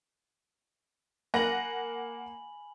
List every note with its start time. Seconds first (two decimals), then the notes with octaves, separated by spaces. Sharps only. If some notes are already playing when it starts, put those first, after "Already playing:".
1.34 A#3 F#5 G#5 B5 A#6 F#7